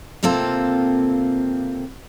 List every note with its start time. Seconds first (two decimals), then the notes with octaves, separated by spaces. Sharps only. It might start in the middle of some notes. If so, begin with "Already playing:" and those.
0.23 C3 A#3 C4 F4 A4